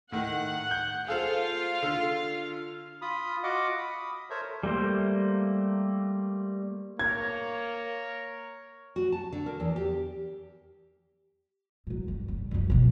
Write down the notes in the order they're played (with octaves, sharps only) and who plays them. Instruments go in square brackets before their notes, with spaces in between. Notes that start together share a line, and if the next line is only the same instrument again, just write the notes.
[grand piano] A2 D#3 [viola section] F#5
[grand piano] G6
[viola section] F4 F5 [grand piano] G#4 A4 C5
[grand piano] D3
[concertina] F4 B5 D#6
F4 F#4 D#5 F#5 D6
B5 D#6
A4 A#4 C5 C#5 E5
[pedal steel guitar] G3 A3 A#3 C5
[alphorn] A#3 [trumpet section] A#4 C#5 [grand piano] G#6
[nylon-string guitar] F#4
A5
D3
A#4
E2
G4
[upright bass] A2 F#3
G2
C#3
F#2 F3
B2 F3